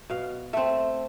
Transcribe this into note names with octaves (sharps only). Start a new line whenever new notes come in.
B2 F5
A3 C4 E5